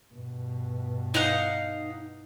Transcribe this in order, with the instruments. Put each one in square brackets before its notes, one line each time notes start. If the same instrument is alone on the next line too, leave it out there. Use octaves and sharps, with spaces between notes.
[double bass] G2 B2
[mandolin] D#4 F5 F#5